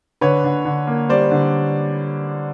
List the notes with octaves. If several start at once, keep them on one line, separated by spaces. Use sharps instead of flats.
D3 B4 C#5
D3
D3
A#3
G3 C5 D5
D3